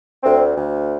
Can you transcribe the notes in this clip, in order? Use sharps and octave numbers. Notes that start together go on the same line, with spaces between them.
D2 C4
D2